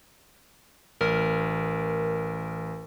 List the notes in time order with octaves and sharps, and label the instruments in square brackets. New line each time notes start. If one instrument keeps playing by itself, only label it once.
[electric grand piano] A1 [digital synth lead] A#4